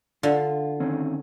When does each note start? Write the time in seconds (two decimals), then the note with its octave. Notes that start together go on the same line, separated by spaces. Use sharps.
0.23 D3 F4
0.80 D#3 C4 C#4